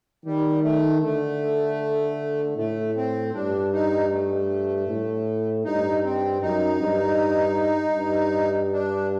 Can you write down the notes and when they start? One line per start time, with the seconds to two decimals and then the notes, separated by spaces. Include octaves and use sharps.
0.25 D#3 G3
0.63 A3
1.02 D3 A3
2.56 A2 A3
2.95 C4
3.34 G2 D4
3.72 D#4
4.11 A3
4.88 A2
5.64 G2 D#4
6.04 C4
6.42 F#2 D#4
6.81 G2
7.96 G2
8.73 D4